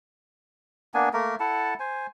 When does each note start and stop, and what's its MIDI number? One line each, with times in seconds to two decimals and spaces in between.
0.94 1.09 58
0.94 1.09 59
0.94 1.09 62
0.94 1.09 80
1.13 1.35 57
1.13 1.35 58
1.13 1.35 70
1.40 1.74 64
1.40 1.74 69
1.40 1.74 78
1.40 1.74 81
1.79 2.07 72
1.79 2.07 80